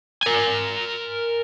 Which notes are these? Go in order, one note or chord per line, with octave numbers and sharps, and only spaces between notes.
A#4 G#5